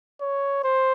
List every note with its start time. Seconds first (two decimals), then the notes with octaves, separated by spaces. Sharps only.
0.21 C#5
0.64 C5